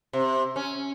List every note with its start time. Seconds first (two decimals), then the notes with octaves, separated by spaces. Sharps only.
0.13 C3
0.56 C#4